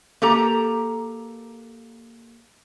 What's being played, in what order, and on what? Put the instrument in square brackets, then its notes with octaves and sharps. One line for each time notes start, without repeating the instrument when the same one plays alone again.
[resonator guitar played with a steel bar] A#3 G4 A4 A#5